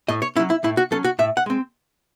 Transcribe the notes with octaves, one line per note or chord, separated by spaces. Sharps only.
A2 D#5
C#5
F#3 C#4 E4
E4
A2 E4
F#4
F#3 C#4 A4
F#4
A2 E5
F#5
G#3 C4